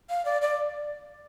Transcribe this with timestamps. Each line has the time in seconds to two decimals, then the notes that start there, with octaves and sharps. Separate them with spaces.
0.10 F5
0.25 D5
0.42 D5